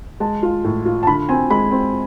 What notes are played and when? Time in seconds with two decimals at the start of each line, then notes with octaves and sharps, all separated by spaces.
0.20 G#3 A5
0.43 F4
0.64 A2
0.85 F4
1.03 A5
1.07 D3 B5
1.29 C4 G#5
1.50 G#3 B5
1.71 C4